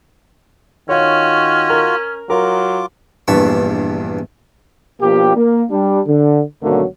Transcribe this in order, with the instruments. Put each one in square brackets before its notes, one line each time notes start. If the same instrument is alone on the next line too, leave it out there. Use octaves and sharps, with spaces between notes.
[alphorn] D#3 [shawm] C#4 [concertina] F4 F#4 [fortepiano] C#5 F5
[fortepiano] A#4
[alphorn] F#3 [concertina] F4 D6 [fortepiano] A#4
[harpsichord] A#1 E2 G2 B4 A5 C#6
[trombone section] B2 F3 A#3 D4 G4
A#3
G3 D4
D3
G#1 B2 D3 F#3 A3 A#3